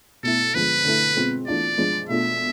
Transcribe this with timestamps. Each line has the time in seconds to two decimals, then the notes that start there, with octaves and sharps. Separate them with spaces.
0.23 B2 A3 E4 A4
0.54 D3 F3 G#3 B4
0.85 D3 A3 E4
1.16 B2 G#3 C4 F4
1.47 E3 A3 D4 F4 D5
1.78 F3 G#3 D4 F4
2.09 B2 A3 D4 F4 E5